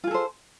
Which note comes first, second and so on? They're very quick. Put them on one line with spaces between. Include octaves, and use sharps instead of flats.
F4 G#4 A4 C5